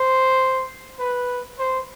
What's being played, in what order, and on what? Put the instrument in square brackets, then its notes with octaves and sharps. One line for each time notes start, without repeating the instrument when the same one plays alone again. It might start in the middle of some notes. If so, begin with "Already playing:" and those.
Already playing: [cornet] C5
B4
C5